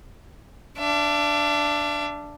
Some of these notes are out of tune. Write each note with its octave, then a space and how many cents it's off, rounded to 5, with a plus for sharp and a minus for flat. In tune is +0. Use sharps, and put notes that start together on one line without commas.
D4 +0 E5 +45